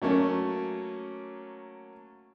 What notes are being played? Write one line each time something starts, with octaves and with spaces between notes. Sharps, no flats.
F#3 A3 A#3 C#4